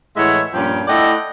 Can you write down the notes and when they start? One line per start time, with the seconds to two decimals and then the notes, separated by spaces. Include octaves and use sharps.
0.17 A2 E3 G#3 C#5 E5 F#5
0.53 G2 A#2 F3 C#4 G5
0.87 A3 E4 D5 D#5 F#5 G5